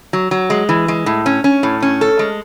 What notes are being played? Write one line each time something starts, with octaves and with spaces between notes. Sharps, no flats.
F#3
F#3
G#3
E3
G#3
A2
C#4
C#4
A2
C#4
A4
G#3